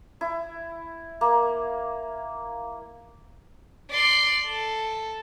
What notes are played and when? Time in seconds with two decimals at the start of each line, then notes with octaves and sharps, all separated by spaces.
0.21 E4
1.21 A#3
3.90 D5 C6
4.47 A4